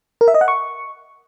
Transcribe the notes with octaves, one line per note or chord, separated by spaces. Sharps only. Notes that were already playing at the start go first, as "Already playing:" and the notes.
A#4
E5
D#5
F#5
C#6